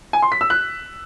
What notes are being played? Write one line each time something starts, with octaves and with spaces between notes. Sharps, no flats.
G#5
C6
B6
E6
F#6